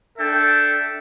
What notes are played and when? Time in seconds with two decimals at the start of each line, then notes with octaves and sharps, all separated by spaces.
0.18 D4 A4 E5 G5